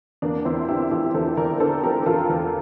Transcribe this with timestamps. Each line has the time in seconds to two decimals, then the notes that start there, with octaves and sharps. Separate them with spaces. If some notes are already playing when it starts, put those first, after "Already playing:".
0.22 E2 A#3 D4
0.45 E2 C4 E4
0.69 D3 E4 G4
0.91 F3 E4 G4
1.14 E2 A4 C5
1.37 E2 A#4 D5
1.60 D3 A4 C5
1.83 F3 G4 A#4
2.06 E2 F4 A4
2.29 E2